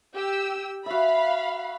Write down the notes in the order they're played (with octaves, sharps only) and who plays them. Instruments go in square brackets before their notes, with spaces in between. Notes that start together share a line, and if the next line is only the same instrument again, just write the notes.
[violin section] G4 G5 E6
[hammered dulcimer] F#4 E5 [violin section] F5 B5